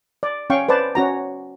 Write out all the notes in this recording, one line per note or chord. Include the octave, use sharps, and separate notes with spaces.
D5
C#4 F5 G5 C#6
B4 C5 D5 A5
C#4 F#4 A#5